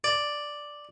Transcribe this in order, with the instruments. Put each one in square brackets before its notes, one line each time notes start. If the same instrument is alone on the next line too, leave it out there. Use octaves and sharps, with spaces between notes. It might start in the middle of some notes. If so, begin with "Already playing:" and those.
[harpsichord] D5